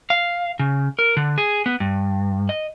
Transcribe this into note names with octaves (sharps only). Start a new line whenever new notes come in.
F5
C#3
A#4
D3
G#4
B3
G2
D#5